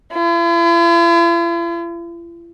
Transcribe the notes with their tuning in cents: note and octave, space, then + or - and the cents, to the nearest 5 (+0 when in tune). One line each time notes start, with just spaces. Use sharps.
E4 +45